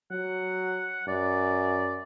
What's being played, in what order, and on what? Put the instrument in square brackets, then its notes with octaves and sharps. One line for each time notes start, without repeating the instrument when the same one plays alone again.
[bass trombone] F#3 [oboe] F#5
[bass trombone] F#2 [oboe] D5